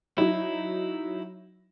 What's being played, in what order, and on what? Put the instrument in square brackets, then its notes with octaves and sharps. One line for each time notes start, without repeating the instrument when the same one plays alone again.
[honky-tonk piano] F#3 D#4 [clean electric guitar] E4